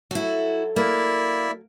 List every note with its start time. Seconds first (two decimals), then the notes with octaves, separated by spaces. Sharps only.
0.11 F#3 E4 F#4 A4
0.76 A#3 E4 D5 E5